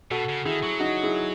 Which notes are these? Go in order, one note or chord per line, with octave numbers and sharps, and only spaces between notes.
B2 F#4 A4
C#3
D#3 E4 G#4
F#3
D#4 F#4
E4 G#4